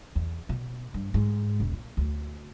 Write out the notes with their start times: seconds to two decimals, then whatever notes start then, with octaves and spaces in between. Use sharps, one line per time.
0.15 E2
0.49 B2
0.94 G2
1.14 G#2
1.60 E1
1.73 A#2
1.97 D2